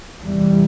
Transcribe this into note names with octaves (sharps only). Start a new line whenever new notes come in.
E2 C3 E3 G3